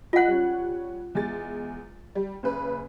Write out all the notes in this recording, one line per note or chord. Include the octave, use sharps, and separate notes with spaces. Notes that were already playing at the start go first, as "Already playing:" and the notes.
F4 D#5 F#5 F#6
G3 C#4
E2 G#3 A6
G3
F#1 C#3 B4